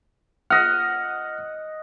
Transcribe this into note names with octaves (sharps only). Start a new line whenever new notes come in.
D#5 F#5 F6